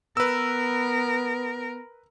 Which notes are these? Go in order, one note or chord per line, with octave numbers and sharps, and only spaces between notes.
B3 A#4 B4 E6